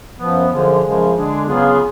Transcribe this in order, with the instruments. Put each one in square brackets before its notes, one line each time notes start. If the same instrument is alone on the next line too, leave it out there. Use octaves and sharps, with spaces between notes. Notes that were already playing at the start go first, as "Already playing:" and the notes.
[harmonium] F#2 F3 B3
F#2 D3 F3 G#3
F#2 C#3 F3 G#3
D3 G#3 D4 G#4
C#3 F#3 B3 F4 G#4